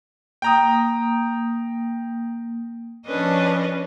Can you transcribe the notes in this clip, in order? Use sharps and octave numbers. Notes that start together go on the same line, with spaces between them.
A#3 G5 A#5 D#6
F3 C#4 D4 B4 C#5 D#5